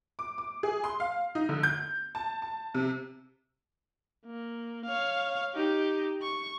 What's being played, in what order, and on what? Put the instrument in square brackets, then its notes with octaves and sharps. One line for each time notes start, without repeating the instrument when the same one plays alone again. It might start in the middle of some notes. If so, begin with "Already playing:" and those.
[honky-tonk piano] D6
D6
G#4
C6
F5
D#4
D3
G6
A5
A5
C3
[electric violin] A#3
C#5 F5
D#4 G4
C#6